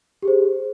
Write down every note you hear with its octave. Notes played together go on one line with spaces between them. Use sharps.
G4 G#4 C5